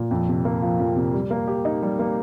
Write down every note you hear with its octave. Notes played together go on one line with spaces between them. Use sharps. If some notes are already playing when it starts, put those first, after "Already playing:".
Already playing: A#2
F2
C3
A#3
F3
F2
C3
G3
A#3
G4
D#4
G3
A#3